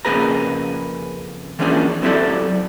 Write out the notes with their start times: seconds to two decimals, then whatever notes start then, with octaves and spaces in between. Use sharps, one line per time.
0.05 F2 C#3 A#3 G#4 B4 A#5
1.59 E3 F3 A#3 C#4 D4 G#4
2.02 F#3 C4 E4 G4 A4 D5